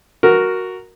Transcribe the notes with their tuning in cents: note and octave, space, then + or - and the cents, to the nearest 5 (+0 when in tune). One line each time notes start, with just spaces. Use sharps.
F#4 +0 A#4 +0